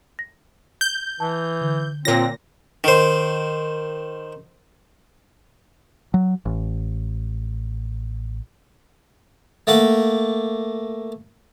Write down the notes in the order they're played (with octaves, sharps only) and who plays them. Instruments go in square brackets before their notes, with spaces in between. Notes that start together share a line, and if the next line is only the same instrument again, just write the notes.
[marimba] A#6
[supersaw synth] G6
[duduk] E3 [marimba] A5
[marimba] D3
[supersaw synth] A#2 A#6 [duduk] C4 [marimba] F4 C#5
[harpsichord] D#3 C5
[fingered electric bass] F#3
A1
[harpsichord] A3 A#3 F#5